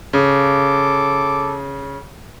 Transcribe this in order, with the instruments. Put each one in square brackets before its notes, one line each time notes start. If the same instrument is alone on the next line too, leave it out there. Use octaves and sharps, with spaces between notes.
[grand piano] C#3 [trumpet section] A4 D6